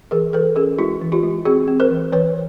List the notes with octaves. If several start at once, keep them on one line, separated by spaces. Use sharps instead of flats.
E3 G#4 A#4
E3 A4 B4
C#4 G#4 A#4
G#3 E4 F#4
E3
F4 G4
G#3
C4 F#4 G#4
C4
A#4 C5
E3
E3 B4 C#5